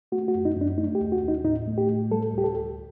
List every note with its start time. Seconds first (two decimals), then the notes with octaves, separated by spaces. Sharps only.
0.12 A3 F#4
0.28 F#4
0.35 F#2
0.45 D#4
0.56 F#2 D4
0.78 A3 D#4
0.95 G4
1.01 D#2
1.12 F#4
1.23 D#2
1.28 D#4
1.44 A2 D#4
1.67 A3
1.78 G4
1.90 A2
2.11 G3 A4
2.33 D2 G4
2.44 A4
2.55 D2